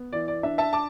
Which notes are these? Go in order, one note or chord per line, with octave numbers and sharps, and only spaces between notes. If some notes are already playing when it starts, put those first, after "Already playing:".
Already playing: B3
E3 D5
D5
D4 E5
E5 A5
A5 D6